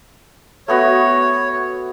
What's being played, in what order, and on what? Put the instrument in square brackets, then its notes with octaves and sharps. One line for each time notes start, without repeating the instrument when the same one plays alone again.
[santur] A3 B3 F#4 [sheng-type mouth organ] C#5